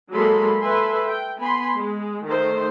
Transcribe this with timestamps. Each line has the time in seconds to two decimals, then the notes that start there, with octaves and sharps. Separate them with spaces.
0.12 F#3 G#3 A#3 A4 B5 C6
0.60 A4 B4 E5 G#5 C6
1.07 G5
1.39 B3 G#5 B5 C6
1.78 G#3
2.25 D#3 A3 C5